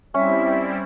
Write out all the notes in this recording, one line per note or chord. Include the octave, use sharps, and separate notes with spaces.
G3 C4 C#4 E4 E5